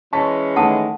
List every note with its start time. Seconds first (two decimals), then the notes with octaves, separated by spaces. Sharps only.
0.13 E3 G#3 C#4 A5 C#6 B6
0.56 D#3 A3 F#5 A5 D#6